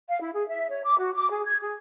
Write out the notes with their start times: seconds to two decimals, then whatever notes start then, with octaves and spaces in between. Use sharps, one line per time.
0.09 F5
0.22 E4
0.35 G#4
0.48 E5
0.69 C#5
0.84 D6
0.99 F#4
1.15 D6
1.30 G#4
1.47 G#6
1.62 G#4